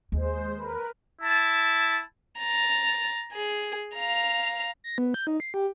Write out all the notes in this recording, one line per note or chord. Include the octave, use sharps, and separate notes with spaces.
D#2 G#3 C5
A#4 B4
E4 A5
A#5 A6
G#4
F5 A#5
A#6
B3
G6
D#4
C7
G4